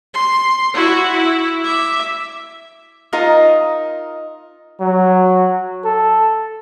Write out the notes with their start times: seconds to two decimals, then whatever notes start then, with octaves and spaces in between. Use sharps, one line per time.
0.14 C6
0.74 E4 F#4
1.13 E4
1.64 E5 D6
3.13 D#4 F4 A#4 D#5
4.81 F#3
5.85 A4